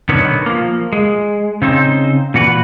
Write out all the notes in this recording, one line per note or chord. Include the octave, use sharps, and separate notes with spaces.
B2 D3 D#3 F#3 B3
F3 A#3
G#3
C#3 C4 D#4 C5
A#2 E3 F#4 A#4 B4